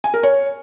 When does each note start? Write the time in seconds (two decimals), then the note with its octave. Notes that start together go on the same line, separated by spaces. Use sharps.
0.04 G#5
0.14 A#4
0.23 C#5